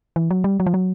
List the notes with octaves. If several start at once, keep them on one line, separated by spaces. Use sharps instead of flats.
E3
F#3
G3
F#3
F3
F#3